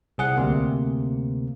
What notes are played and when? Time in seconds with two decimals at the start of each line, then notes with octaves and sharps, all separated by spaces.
0.18 C2 G#4 F#5
0.36 D2 C3 A#3